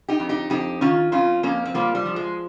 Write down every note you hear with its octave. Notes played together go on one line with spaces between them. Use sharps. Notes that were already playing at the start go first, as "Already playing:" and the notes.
D#4 G4
F2
D#4 G4
F2 D#4 G4
D#3 C#4 F4
F2 C#4 F4
F2 A#3 C#4
C4
F3 G3 A#3
G3
F3
G#3